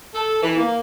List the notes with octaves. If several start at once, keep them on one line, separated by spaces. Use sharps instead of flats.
A4
E3
A#3